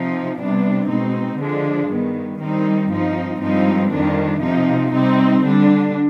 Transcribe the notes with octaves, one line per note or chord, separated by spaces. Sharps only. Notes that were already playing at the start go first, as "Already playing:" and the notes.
Already playing: C3 F3 C4 D#4
C3 G3 B3 D4
B2 G#3 C4 D#4
D3 F3 G#3 D4
G2 D#3 B3
D#3 G3 C4 D#4
G2 F3 C4 D#4
G2 F3 G#3 C4 D#4
F2 D#3 G3 D4
C3 F3 C4 D#4
C3 G3 C4 D#4
D3 G3 D4